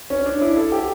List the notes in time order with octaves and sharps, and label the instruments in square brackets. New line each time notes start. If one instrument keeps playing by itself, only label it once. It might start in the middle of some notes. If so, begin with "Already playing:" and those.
[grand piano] C#4
D4
E4
A4
G4